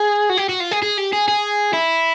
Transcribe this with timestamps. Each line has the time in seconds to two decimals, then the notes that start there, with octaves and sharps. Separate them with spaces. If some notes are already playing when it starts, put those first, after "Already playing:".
Already playing: G#4
0.30 F#4
0.38 G4
0.49 F#4
0.60 F4
0.72 G#4
0.83 G#4
0.98 G4
1.13 G#4
1.28 G#4
1.74 E4